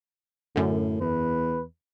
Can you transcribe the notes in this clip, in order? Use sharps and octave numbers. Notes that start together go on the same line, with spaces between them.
F#2 A2 D3
E2 B4